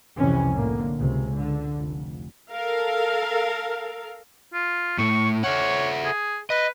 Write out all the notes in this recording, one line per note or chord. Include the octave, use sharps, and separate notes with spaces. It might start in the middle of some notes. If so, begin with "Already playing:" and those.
C2 F2 C3 E3 C#4
A2 D3 A#3
C#2 C3
D3
F1
A4 A#4 F5
F4
A2 A3 C#6
A4 C#5 E5 F#5
G#4
B4 D#5